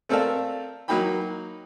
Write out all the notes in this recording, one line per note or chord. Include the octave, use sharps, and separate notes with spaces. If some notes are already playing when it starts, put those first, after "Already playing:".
A3 C4 A4 A#4 D5 F5
F#3 A#3 D#4 F#4 G5 B5